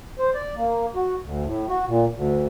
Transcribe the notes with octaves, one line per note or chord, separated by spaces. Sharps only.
C5
D5
A#3
F#4
D2
A2
F#4
A#2
D2